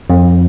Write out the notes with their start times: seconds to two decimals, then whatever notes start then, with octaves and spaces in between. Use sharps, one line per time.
0.10 F2